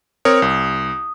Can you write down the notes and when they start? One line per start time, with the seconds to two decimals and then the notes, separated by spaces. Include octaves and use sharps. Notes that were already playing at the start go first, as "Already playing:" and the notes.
0.25 C4 A#4 C#5 D#6
0.42 C2